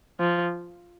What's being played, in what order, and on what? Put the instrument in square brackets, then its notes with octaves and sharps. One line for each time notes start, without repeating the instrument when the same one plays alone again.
[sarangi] F3